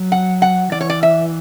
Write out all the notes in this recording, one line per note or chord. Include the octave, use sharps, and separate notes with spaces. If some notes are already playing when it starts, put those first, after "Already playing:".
Already playing: F#3
F#5
F#5
E3 D5
C#5
D5
E5